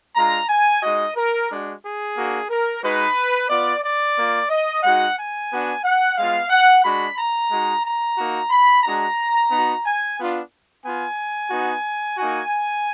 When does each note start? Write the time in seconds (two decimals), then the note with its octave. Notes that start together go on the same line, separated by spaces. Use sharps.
0.15 G#3 D4 F4 A#5
0.49 G#5
0.82 G#3 D#4 F#4 D#5
1.16 A#4
1.49 G#3 D4 F#4
1.82 G#4
2.16 A#3 D4 F#4
2.49 A#4
2.83 G#3 D#4 F#4 B4
3.49 B3 F4 D5
3.83 D5
4.16 A#3 F4
4.49 D#5
4.83 G#3 D#4 F#4 F#5
5.17 G#5
5.50 B3 D4 F#4
5.83 F#5
6.16 G#3 B3 F4 F5
6.50 F#5
6.83 G#3 D4 F#4 B5
7.17 A#5
7.50 G#3 D#4 F#4
7.84 A#5
8.17 A#3 D#4 F#4
8.50 B5
8.84 G#3 D4 F#4 A#5
9.50 B3 D#4 F#4
9.83 G#5
10.17 B3 D4 F4
10.84 B3 F4 G#5
11.50 B3 D#4 F#4
12.18 A#3 D#4 F#4 G#5